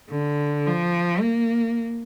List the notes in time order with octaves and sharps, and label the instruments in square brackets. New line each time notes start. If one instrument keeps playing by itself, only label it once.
[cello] D3
F3
A#3